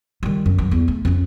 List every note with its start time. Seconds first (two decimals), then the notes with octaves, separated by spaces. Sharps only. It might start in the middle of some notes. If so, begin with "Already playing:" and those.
0.23 D#3 G3
0.46 F#2
0.59 D#3 F#3
0.71 E2
0.88 A3
1.05 F2 C#4